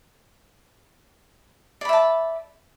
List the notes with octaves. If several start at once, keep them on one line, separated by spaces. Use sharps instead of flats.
D5 E5 A5 B5